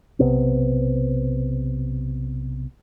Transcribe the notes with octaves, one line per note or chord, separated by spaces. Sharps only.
B1 C3 B3 C4